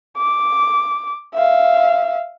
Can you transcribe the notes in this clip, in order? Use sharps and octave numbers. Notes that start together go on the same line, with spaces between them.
D6
E5 F5